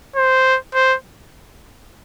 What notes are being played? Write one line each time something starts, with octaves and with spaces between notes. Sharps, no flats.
C5
C5